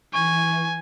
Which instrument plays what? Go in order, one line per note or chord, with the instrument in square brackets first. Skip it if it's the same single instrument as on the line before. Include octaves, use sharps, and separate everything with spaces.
[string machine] E3 [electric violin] G#5 [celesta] C#6